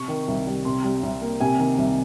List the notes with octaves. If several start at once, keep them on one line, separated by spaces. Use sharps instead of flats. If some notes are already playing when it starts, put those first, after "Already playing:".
Already playing: C3 C#6
D#3
C2
G3
C3 C6
G3
C2
A#3
C3 G#5
D#3
C2